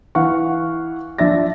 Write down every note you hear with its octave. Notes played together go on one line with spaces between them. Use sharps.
E3 F5 F#5 C#6
F3 D4 E5 A6 A#6